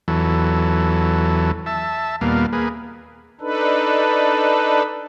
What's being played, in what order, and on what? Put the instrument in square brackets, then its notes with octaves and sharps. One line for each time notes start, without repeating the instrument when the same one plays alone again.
[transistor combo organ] E2 E3 F#3 A4
E5 A5
D#2 A#2 G3 A#3 B3 F5
A#3 G#4 B4
[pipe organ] D4 D#4 A4 B4